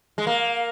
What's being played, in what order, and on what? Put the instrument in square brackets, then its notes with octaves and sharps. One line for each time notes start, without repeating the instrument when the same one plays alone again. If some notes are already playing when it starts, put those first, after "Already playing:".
[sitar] G#3
A#3